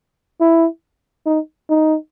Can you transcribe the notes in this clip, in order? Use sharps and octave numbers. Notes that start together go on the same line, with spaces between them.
E4
D#4
D#4